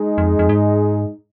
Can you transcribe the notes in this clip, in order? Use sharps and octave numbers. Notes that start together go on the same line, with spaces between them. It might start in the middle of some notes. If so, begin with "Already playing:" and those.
Already playing: G#3 D#4 G#4
F2
F2
G#2